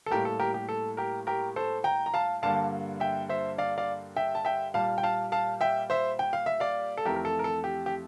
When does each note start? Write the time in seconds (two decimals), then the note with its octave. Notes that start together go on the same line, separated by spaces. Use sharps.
0.06 A4
0.10 A2 G3 A#3 G4 A#4
0.25 A4
0.40 G4 A#4
0.54 G4
0.69 A4
0.97 G4 A#4
1.27 G4 A#4
1.56 A4 C5
1.84 G5 A#5
2.06 A#5
2.14 F5 A5
2.42 G2 D3 G3 A#3 F5 A5
3.00 E5 G5
3.29 C5 E5
3.58 D5 F5
3.78 D5 F5
4.16 E5 G5
4.35 A5
4.45 E5 G5
4.74 A#2 G3 A#3 F5 A5
4.98 G5
5.03 F5 A5
5.32 F5 A5
5.61 E5 G5
5.90 C5 E5
6.19 G5
6.33 F5
6.46 E5
6.60 D5 F5
6.97 A4
7.06 F2 E3 A3 G4 A#4
7.16 A#4
7.25 A4
7.39 A#4
7.44 A4
7.64 G4
7.86 G4